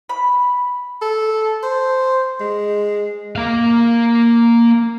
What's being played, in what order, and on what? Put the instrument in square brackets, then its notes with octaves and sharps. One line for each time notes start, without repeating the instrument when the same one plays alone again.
[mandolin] B5
[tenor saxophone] A4
C5
G#3
[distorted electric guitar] A#3 F5